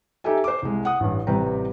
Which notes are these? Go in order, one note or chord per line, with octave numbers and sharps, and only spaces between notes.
D#4 G4 A4 E5 G#5
C5 D6
C2 G#3
F#5 D#6
A1 G2
A1 C3 G3 B4 G5 A#5